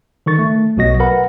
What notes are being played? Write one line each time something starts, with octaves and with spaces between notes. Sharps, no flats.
D3 D#3 C#6 A6
A3
B1 B2 F#3 F#4 D#5 A#6
A#4 B4 F#5 B5